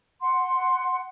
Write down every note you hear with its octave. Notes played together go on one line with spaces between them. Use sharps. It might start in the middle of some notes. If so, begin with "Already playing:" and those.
F#5 C6